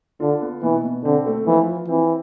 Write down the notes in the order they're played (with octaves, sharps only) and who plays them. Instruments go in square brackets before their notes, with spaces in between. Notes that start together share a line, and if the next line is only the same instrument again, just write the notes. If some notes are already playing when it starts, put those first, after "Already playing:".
[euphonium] D3 [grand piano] F4
[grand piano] B3
[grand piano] B2 [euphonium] E3
[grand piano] B2
[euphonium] D3 [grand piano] C4
[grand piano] A3
[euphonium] E3 [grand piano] F3
[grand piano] F4
[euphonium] E3 [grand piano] C4